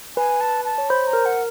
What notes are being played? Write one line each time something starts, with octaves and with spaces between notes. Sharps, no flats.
B4 G#5
A5
A5
C#5
C5 B5
A#5
A#4
F#5